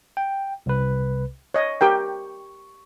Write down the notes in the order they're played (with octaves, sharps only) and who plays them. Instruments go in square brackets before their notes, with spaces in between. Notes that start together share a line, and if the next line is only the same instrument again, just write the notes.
[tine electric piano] G5
C2 C3 B4
[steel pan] C#5 D#5 [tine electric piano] C#6
[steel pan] G4 A#4 G5